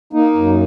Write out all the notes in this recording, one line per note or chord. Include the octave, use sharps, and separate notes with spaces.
A#3 D#4
F#2